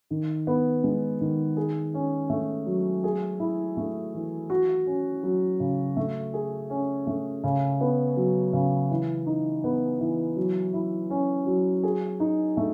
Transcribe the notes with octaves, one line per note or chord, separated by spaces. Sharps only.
D#3
B3
G#3
D#3
G#4
C#4
A3
F#3
G#4
E4
A3
E3
F#4
C#4
F#3
C#3
A3
G#4
C#4
A3
C#3
B3
F#3
C#3
E3
D#4
B3
E3
F#3
E4
C#4
F#3
G#4
D#4
A3